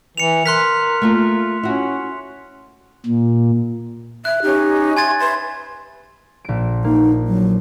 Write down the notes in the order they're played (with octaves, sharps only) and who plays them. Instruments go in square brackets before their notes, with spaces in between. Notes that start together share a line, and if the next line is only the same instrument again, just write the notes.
[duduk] E3 [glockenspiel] C#7 F7
[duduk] A#4 [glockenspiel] C6 F#6 B6
[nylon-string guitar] A3 A#3 F4
[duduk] C#4 [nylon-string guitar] E4 F#4
[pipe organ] A#2
[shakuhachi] E5 [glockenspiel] F#6
[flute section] C#4 D#4 [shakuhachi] G4
[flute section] E5 [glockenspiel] G#5 G#6 A6 [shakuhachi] C6
[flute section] B4 E5 [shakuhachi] C6
[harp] A#1 D7
[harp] A#3 [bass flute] D#4
[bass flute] F#3